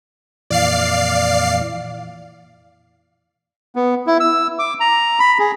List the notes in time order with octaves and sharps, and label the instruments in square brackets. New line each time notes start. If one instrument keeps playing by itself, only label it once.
[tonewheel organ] F2 A#2 E3 [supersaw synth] D5 F5 C7
[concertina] B3
E4
E6
D6
A#5
B5
G#4